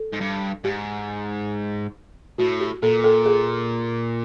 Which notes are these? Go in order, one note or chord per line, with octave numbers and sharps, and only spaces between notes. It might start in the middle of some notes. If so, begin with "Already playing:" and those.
Already playing: A4
G#2
G2
G#2 G4
A2 F#4
G4
A#2 A4
A4
G#4